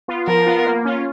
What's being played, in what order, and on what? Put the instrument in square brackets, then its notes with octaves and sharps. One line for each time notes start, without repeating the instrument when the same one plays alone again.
[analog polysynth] B3 F4
[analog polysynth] F3 [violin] A#4
[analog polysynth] B3 F4
A#3
C#4 F4